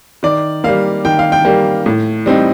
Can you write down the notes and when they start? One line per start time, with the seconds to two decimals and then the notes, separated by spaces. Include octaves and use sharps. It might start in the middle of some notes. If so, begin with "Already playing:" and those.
0.23 D#3 D5
0.64 G3 A#3 F5
1.05 D#3 G5
1.19 F5
1.32 G5
1.45 G3 A#3
1.86 A2
2.26 G3 C4 D#4